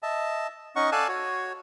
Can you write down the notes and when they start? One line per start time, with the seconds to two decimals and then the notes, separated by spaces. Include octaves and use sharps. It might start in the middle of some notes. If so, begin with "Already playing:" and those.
0.03 D#5 E5 A5
0.76 C#4 D#4 D#5 F#5 C#6
0.92 A4 D5 F5 G#5 A5 F#6
1.08 F#4 C#5